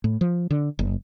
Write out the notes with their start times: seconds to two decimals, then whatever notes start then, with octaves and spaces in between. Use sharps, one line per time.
0.04 A2
0.21 F3
0.51 D3
0.79 F#1